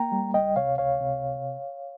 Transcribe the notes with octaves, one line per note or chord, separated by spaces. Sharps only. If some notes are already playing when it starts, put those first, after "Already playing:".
Already playing: A#3 G5 A#5
G3
C#2 D#5 G5
C3 C#5 F5
C#2 C#5 F5
C3